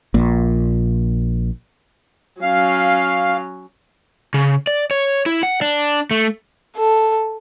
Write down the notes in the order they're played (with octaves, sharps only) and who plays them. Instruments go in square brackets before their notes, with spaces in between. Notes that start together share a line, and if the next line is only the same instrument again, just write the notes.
[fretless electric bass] A#1 A#2
[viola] F#3 C#4 [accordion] F5
[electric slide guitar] C#3
D5
C#5
E4
F#5
D4
A3
[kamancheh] A4